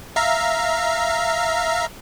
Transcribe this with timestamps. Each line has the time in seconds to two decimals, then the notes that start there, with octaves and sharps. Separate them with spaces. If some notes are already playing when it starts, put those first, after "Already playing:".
0.16 E5 F5 A#5